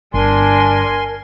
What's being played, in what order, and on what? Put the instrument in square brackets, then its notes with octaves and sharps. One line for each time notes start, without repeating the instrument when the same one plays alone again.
[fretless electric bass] G1 [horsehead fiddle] D4 [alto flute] A#4 [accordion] G#5 C6